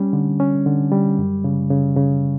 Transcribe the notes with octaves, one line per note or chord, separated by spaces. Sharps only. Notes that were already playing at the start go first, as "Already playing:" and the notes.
Already playing: G3 C#4
D3
C#4
D3
G3
F#2
C#3
C#3
C#3